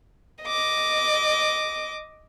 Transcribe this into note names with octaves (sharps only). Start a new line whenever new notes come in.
D#5 D6